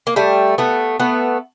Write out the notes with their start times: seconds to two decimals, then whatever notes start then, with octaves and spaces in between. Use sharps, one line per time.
0.07 A#3
0.16 G3 A3
0.58 A3 B3
1.00 A3 B3